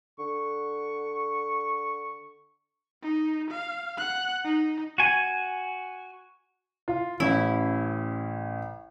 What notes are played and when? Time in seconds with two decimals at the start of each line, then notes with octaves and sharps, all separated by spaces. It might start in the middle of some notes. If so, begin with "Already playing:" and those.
0.19 D3 C#6
3.02 D#4
3.51 F5
3.97 F#5 F#6
4.45 D#4
4.98 F#4 G#5
6.88 F4
7.20 A1 C#4 E4